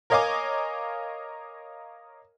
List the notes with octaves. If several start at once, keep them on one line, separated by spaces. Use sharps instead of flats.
A#4 C#5 D#5 F5 G#5 D6